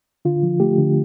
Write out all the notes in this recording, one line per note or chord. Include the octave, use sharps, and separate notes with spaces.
D3 F4
F3
A3 G4
D3